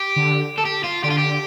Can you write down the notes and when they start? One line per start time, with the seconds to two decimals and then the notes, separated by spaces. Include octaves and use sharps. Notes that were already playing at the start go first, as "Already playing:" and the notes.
Already playing: G4
0.16 D3
0.58 A4
0.65 G4
0.84 F4
1.03 D3 G4
1.10 F4
1.18 G4